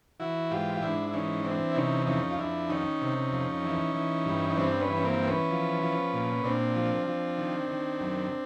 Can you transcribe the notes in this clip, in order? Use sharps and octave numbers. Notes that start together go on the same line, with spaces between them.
E3 E4 F#4
G#2 F4 G4
F4
G#2 D4 E4
E4
E3 C#4 D#4
E3 C4 D4
E4
C3 C#4 D#4
F2 C#4 D#4
F4
F2 D4 E4
D#3 C#4 D#4
C3
F2
E3
E3
G2
D#4
G2 C4 D4
B3 C#4
E3
C#4
A#3 C4
E3
B3 C#4
F3
F3
A#2
A#2 C4 D4
F3
F3
D#3
D#3
F#2